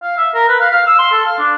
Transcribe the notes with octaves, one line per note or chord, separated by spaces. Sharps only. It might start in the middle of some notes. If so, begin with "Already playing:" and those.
F5
E5
A#4
B4
F5
F5
E6
C6
A4
F5
D4